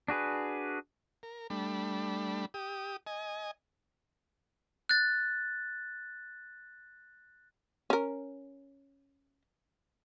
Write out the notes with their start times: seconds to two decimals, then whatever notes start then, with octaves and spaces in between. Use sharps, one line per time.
0.08 D4 F#4 G#4 B4
1.23 A#4
1.50 G3 A3 D4 B5
2.54 G4 D#6
3.07 D#5 G#5
4.89 F#6 A6
7.90 C#4 A#4